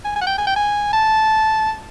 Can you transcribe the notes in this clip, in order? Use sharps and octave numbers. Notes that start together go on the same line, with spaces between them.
G#5
G#5
F#5
G5
G#5
G5
G#5
A5